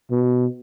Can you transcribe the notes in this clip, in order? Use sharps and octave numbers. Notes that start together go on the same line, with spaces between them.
B2